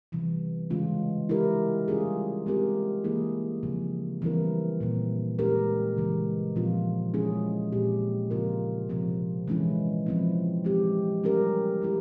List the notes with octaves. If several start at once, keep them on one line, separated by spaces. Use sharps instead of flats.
C3 E3 G3
C#3 E3 G#3 C#4 F4
G#3 E4 G4 A#4
G3 C#4 F4 G#4
G#3 C4 G4 A#4
E3 A#3 E4 G#4
C#3 F3 C4
E3 G3 C4 E4 A#4
A#2 G3 C4
G#3 C#4 G4 A#4
C#3 E3 G#3
A#2 F3 C4 F4
G#3 C#4 E4 G#4
A#2 G#3 C4 G4
C#3 F3 C4 F4 A#4
C3 F3 C4
E3 G#3 C#4 E4
F3 C4 E4
G#3 C4 G4
G3 C#4 G4 A#4
G#3 E4 G4